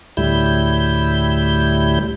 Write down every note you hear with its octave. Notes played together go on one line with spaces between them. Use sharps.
D2 A2 G3 E4 G6